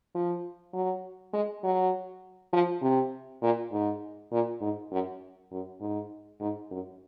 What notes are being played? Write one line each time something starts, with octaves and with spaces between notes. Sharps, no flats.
F3
F#3
G#3
F#3
F3
C3
A#2
G#2
A#2
G#2
F#2
F#2
G#2
G#2
F#2